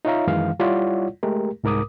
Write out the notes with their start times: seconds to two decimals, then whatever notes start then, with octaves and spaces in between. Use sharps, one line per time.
0.05 D#4 F4 C#5 E5 F5 A#5
0.27 F#2 D#3 E3 G#3 F5
0.59 G3 E4 F4 C#5 D5 F#5
1.23 G#3 A3 G4 A#4
1.64 C2 G#2 A#4 D6 D#6